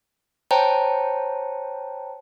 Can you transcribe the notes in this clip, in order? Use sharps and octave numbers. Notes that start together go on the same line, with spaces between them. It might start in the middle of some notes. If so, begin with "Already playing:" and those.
C5 C#5 G5 A5 A#5